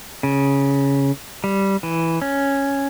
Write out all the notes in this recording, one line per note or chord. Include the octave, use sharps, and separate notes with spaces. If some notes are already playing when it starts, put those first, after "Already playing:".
C#3
G3
E3
C#4